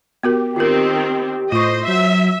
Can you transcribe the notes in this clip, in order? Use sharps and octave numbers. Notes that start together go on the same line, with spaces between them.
B3 F#4 G4 A#4
D#3 C4 F4 A#4
A2 F4 C5 D#5 C#6
F#3 E5